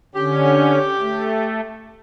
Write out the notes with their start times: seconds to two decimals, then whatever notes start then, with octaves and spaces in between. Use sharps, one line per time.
0.15 D3 C#4 G4
1.00 A3